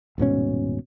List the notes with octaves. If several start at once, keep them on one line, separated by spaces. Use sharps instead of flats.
D#1 G#2 B2 C#4